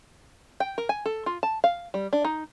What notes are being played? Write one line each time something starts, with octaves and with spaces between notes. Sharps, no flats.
G5
A#4
G#5
A4
F4
A5
F5
G3
D4
D#4